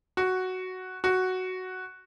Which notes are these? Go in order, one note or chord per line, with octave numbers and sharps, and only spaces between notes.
F#4
F#4